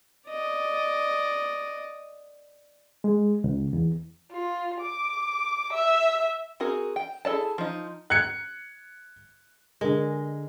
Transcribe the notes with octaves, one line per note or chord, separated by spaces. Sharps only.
D5 D#5
G#3
C#2
E2
F4
D6
E5
C4 F#4 G#4 A#4
G5
E4 G#4 A4 D5 A5
F3 D#4
F#6 G#6 C#7
D3 G#3 A#4